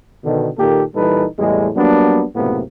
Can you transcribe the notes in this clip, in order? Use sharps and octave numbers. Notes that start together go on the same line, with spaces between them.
B2 D3 D#3
A#2 D#3 A#3 G4 A4
A#2 E3 G3 D#4 A4 B4
E2 A2 G3 G#3
F#3 G3 A#3 B3 D4
C#2 F#2 A2 C3 A#3 B3